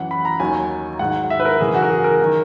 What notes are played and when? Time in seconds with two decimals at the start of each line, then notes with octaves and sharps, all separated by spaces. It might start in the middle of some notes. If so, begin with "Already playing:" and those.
Already playing: F#2 E3 F#5
0.11 B5
0.25 A#5
0.40 D#2 D#3 F#3 G#5
0.99 G#2 D#3 F#3 F#5
1.30 E5
1.40 B4
1.45 A#4
1.60 F#2 C#3 E3 G#4
1.74 F#4
1.83 A#4
1.90 G#4
2.04 A#4
2.22 D#3 F#3